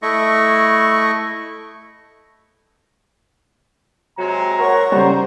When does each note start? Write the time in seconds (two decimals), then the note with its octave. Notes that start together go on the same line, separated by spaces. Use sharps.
0.02 A3 E4 D#5 C#6
4.18 C3 F#3 G#3 A#5
4.59 A#4 C#5 F#5 C#6
4.92 C#3 G3 C5